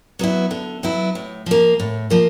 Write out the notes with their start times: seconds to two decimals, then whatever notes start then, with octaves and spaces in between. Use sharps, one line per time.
0.19 F#3 B3 E4
0.51 D3
0.83 F#3 B3 E4
1.15 A2
1.46 F3 A#3
1.80 A2
2.10 F3 A#3